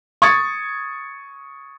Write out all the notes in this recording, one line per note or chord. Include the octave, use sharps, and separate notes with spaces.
C#6 D#6 G#6 A6 C#7